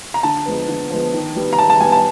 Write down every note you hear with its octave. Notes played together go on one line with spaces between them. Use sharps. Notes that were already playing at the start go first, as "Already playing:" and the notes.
A#5
D3 A5
F3 G#3 B3
D3
F3 G#3 B3
D#3
G3 B3
A#5
D#3 A5
A5
G3 B3 G#5
A5